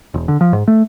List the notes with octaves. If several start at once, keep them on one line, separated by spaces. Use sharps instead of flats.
E1
D3
F3
G#2
A3